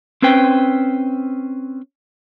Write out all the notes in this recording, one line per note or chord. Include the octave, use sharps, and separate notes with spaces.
C4 C#4 B4 C5 G5